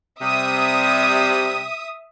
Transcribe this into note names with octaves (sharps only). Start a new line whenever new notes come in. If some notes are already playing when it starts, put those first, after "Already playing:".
C3 G3 E5 D#6